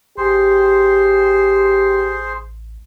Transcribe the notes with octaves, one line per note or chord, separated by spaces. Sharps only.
A1 G4 G#4 C5 C6